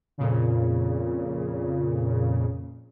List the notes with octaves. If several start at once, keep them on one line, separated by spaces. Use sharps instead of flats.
F2 A#2 C#3